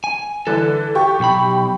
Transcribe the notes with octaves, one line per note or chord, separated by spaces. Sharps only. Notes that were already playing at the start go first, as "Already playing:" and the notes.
G#5
D3 E3 A4
G4 C#6
B1 B5